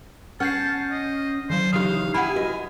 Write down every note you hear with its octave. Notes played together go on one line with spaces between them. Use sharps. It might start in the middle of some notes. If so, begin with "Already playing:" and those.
C#4 F#5 A5 F6 G6 C7
D#5
D#3 F#3 C5
C#3 E3 D#4 G4 F5 D#6
E4 G4 F#5 G#5 B5
F#4 D#5